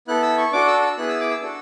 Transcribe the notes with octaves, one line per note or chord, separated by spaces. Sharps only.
B3 E4 A4 F#6
E6
C#6
D4 F#4 A4 D6
E6
E6
B3 E4 G#4 F#6
E6
D6
E6
D4 F#4 A4